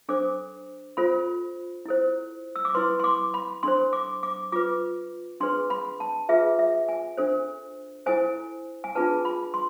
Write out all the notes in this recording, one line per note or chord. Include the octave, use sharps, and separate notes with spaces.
D4 A4 C5 D6
F4 A4 C5 B5
E4 A4 C5
E6
D6
E4 B4 C6
C6
D6
B5
D4 A4 C5 C6
D6
D6
F4 B4 D6
D4 G#4 B4 C6
B5
A5
F4 G#4 B4 E5
E5
G#5
D4 A4 C5
E4 A4 C5 G#5
G#5
D4 F4 G#4 B4 A5
B5
C6